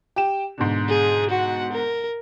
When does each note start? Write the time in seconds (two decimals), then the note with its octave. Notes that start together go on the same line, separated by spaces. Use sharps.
0.16 G4 G5 E7
0.58 G#2 B2 D3
0.89 G#4
1.30 F#4 F#5
1.72 A#4